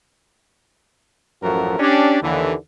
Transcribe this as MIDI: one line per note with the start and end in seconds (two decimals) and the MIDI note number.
1.43 1.76 33
1.43 1.76 42
1.43 1.76 53
1.43 1.76 57
1.43 1.76 66
1.43 1.76 70
1.79 2.18 61
1.79 2.18 62
1.79 2.18 67
2.22 2.53 39
2.22 2.53 50
2.22 2.53 52